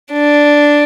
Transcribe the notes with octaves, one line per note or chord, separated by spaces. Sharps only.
D4